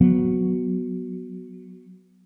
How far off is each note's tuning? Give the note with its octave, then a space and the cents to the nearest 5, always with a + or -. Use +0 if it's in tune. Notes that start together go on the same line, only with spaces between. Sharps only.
F#3 +0 B3 +0